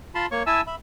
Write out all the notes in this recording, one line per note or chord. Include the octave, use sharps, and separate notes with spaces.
F4 A5 B5 C6
A#3 C#5 C#6
E4 E5 G#5 A5 E6
E5 B5